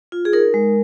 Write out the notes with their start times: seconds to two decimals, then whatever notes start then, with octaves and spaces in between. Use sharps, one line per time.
0.12 F4
0.25 G#4
0.33 D#4 A#4
0.54 G#3